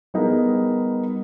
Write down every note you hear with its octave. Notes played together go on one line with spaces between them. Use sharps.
G3 B3 D#4 G#4 A#4